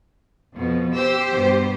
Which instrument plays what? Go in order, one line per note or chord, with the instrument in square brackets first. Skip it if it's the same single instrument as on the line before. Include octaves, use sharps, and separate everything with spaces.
[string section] F2 [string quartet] B2 F3
[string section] G4 C5 [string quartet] E6
[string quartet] G2 B2